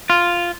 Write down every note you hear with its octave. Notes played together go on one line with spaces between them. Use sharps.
F4